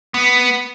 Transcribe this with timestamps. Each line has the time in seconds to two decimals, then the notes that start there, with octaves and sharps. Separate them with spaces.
0.14 B3